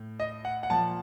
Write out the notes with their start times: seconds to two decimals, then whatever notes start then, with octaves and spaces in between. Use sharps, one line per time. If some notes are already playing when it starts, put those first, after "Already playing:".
Already playing: A2
0.20 D#5
0.45 F#5
0.63 F#5
0.70 A#2 F3 A5